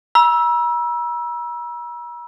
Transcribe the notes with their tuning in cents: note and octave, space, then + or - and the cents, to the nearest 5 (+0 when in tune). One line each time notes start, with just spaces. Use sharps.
A#5 +45 E6 +0